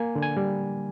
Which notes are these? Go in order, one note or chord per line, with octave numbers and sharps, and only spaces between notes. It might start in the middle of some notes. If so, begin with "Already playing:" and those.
Already playing: A#3 G#5
D3
G#5
G3